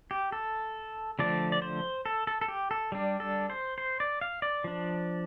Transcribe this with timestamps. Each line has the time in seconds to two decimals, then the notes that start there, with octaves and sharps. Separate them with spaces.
0.11 G4
0.32 A4
1.19 D3 F3 A3 D4 D5
1.52 D5
1.62 C5
2.06 A4
2.27 A4
2.41 A4
2.48 G4
2.71 A4
2.92 G3 D4
3.20 A4
3.50 C5
3.78 C5
4.00 D5
4.21 F5
4.42 D5
4.64 F3 D4